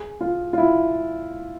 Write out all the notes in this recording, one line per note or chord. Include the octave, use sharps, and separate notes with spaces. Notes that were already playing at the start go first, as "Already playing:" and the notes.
Already playing: G#4
F4
F4
E4